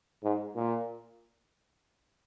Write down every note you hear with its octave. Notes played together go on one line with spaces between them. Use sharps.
G#2
A#2